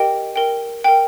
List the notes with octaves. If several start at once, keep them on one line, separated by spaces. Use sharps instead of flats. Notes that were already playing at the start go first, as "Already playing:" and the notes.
Already playing: G4 A#4 D#5 G5
A#4 G5
A#4 G5